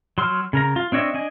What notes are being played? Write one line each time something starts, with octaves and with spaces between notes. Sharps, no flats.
F#3 C6 E6 F6
C#3 A#4 A#5
F4
C4 D4 C#5 D#5 E5
D4 D#5 G#5